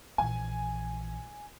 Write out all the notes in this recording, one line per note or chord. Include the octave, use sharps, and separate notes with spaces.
A#1 E3 G#5